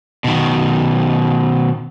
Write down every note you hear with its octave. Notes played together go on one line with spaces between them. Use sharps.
B2 D#3